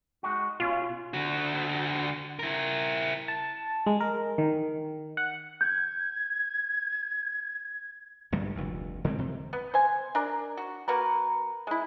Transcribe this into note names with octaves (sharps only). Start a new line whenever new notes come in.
G#3 D#4 F#4
B2 C#4 F4
D3 F#4
E4 A#4
A5
G#3
A#4
D#3
F#5
G6 G#6
A#1 G2 D3 G3
F1 D2
D3 G#3 C4
C3
B3
C5 G#5
D4 A#4
F#4
A#3 F#4 A#4 B4
G#3 E4